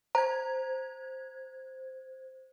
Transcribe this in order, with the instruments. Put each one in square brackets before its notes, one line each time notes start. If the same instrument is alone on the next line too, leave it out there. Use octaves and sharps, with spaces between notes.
[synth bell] C5 G#6 [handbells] A#5